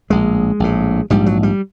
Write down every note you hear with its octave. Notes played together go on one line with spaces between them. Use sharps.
A#1 A2 G#3
A#1 A2
A#1 G#2 G3
F#3
G3